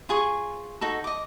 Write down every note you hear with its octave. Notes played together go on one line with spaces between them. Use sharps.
F4 G#4 G#5 C#6
D#4 F#4 A4
D#5 D6